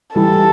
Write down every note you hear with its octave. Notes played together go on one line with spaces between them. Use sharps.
E3 G3 A4